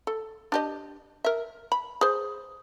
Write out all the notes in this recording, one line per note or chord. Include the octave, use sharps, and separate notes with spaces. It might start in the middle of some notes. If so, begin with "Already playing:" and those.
A4
D4 G4 D#5
A#4 E5
B5
G#4 C5